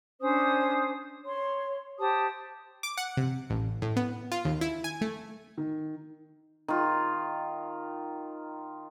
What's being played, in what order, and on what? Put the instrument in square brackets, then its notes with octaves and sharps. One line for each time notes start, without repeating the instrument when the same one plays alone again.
[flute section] C#4 D4 C5 D#6
C#5 C6
G4 C5 A5 D#6
[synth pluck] D6
F#5
C3
A1
A2
B3
F4
D#2
E4
G#5
A3
[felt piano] D#3
[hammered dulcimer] D#3 F4